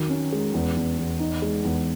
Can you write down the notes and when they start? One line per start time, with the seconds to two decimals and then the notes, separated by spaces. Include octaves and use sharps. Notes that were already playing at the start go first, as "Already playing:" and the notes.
Already playing: D#3 F#3
0.09 C#4
0.32 G#3
0.54 E2
0.76 E2
0.98 E2
1.20 D#4
1.42 G#3
1.64 E2